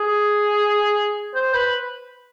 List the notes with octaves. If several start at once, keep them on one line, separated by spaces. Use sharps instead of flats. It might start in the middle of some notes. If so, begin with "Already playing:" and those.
Already playing: G#4
C5
B4